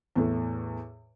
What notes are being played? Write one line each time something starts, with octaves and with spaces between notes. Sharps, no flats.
E2 A2